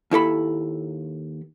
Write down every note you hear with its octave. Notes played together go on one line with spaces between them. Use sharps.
D#2 E4 A4 B5